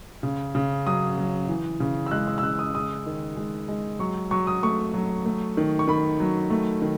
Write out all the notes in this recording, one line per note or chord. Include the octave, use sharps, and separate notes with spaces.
C#3
C#3
F#3 D#6
F#3
E3
C#3
E6
G#3 F#6
E6
E6
C#3 F#6
D#6
G#3 D#6
D#3
G#3
G#3
F#3 C#6
F#3 C#6
D#6
A3 C#6
F#3
A3
D#3
C#6
D#3 B5
F#3
A3
D#3